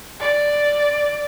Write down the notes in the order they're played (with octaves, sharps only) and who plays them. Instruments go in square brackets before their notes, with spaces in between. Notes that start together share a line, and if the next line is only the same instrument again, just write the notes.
[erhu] D5